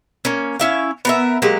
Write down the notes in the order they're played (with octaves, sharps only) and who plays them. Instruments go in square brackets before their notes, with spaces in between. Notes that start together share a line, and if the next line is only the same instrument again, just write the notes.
[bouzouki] A#3 C#4
C#4 E4 F5
B3 A#4 E5
F#3 G#3 A#3 G4